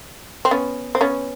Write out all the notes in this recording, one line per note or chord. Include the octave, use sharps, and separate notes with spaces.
C4
B3 C#4
C4
B3 C#4